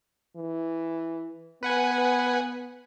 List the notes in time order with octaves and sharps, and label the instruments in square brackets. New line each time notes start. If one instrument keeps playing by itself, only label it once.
[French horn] E3
[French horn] B3 [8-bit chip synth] B4 F#5 G#5